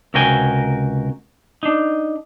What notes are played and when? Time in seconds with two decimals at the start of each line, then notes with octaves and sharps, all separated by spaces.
0.14 C#2 C3 F#4 A#4 G5 G#5
1.63 D4 D#4